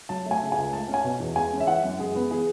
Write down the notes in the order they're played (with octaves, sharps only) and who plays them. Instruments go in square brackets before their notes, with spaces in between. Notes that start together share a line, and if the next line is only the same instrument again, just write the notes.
[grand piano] F#3 A5
A3
G#5
C#3
G#5
C#2
A3 A5
C#4
G#5
B2
E2
G#3 G#5
C#4
E5
E3 F#5
F#2
G#3 G#4
B3
E3 G#4